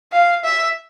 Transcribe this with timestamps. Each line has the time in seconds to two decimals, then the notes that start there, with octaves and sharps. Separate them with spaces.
0.12 F5
0.44 E5